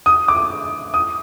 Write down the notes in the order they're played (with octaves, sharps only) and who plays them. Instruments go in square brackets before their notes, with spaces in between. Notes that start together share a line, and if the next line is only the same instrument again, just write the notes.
[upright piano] D#6
D6
D#6